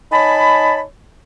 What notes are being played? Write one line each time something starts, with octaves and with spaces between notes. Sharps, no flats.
D#4 C#5 G#5 A5 B5